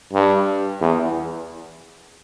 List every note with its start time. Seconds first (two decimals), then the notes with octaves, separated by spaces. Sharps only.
0.13 G2
0.81 E2